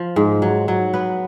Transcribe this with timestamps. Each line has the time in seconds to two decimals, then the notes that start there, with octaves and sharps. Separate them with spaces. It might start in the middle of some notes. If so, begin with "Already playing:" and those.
Already playing: F3
0.16 G#2
0.42 F#3
0.68 F#3
0.93 B3 B4